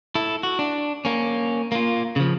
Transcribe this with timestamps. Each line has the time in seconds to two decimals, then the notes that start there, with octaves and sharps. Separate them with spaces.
0.15 E4 A4
0.43 F#4
0.59 D4
1.05 A#3 C#4
1.72 A#3 F4
2.16 C#3 F3